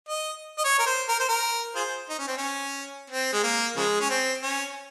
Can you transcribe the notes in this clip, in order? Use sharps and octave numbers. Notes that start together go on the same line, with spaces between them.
D#5
D#5
C#5
A#4
C5
A#4
C5
A#4
F4 G#4 C5
D#4
C#4
C4
C#4
C4
G#3
A#3
C#3 F3 G#3
C#4
C4
C#4